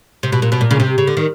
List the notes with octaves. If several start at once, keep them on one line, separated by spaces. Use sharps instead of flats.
C3
B2
A#2
B2
A#2
C#3
C3
C#3
D3
D#3